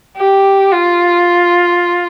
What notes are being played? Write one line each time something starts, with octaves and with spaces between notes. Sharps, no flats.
G4
F4